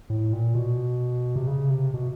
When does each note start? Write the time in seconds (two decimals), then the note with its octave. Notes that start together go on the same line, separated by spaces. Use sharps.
0.10 A2
0.33 A#2
0.55 B2
1.36 C3
1.47 C#3
1.70 C3
1.94 B2